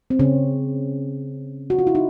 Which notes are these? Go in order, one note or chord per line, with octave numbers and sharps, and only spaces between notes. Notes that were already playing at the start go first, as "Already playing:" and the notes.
C4
C#3 C#4
F#4
F4
E4
D#4